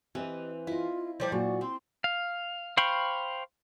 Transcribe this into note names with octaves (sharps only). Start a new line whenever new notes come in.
E3 C4 G4 D#5
E4 F4 D#5 F5
F3 G3 C5 D5
A#2 F#3 F#4 C5 D5
C4 C6
F5
C5 F5 G5 B5 C#6